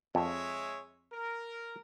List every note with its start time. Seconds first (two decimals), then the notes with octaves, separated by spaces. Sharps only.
0.15 F2 G#3 C#5 E5
1.12 A#4